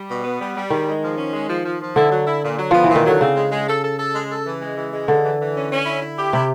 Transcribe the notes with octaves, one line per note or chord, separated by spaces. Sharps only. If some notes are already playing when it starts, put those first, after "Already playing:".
Already playing: G3
B2
B3
G3
G3
D#3 G#3
G#3
F3
C#4
G#3
F3
F3
F3
D3 E4
F#3
E4
A#2
F#3
F3 B3
E3
A#2
D#3
D3 F#3
C#3 C4
G#3
G#3
A4
A4
A4
G#3
A4
E3
G#3
E3
G#3
D3 E3
E3
E3
C#4
C#4
E4
E4
G4
C3 E4